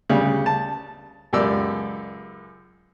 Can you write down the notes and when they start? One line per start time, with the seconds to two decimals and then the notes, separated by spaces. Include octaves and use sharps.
0.09 D2 C#3 G3
0.46 A5
1.33 C#2 F#2 G4 D5 E6